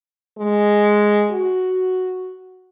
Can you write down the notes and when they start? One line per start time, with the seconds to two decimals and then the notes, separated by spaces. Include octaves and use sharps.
0.38 G#3
1.31 F#4